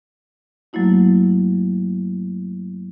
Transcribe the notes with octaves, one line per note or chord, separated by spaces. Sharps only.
G2 F#3 A3 A#3 E4 F#4